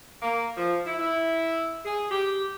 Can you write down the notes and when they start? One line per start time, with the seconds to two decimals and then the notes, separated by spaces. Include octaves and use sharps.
0.22 A#3
0.57 F3
0.86 E4
0.99 E4
1.86 G#4
2.11 G4